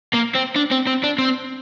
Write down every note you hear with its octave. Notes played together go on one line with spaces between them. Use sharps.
A#3
C4
D4
C4
C4
D4
C4